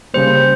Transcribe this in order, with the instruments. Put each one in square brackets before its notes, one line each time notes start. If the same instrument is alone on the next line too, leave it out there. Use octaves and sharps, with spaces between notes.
[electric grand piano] C#3 G3 A#3 [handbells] C5